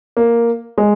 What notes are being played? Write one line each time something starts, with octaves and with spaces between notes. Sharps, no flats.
A#3
G#3